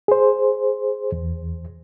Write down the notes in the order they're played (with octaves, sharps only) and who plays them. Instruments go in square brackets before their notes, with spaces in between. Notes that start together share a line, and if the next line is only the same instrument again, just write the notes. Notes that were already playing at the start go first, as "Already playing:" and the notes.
[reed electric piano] G#4 C5
E2